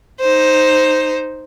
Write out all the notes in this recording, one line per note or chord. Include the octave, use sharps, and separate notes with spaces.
D#4 C5